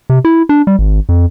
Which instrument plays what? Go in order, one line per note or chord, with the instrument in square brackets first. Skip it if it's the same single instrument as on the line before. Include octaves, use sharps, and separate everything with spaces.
[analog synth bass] C3
E4
D4
G3
G#1
F2